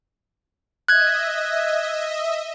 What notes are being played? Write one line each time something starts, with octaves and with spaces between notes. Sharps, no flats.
D#5 E5 F#6 G#6